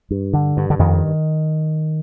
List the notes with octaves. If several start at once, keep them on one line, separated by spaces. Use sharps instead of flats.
G2
D3
G2
D3
F2 D#3